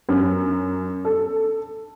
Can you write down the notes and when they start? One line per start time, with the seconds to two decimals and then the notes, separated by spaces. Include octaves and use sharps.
0.09 F#2
1.05 A4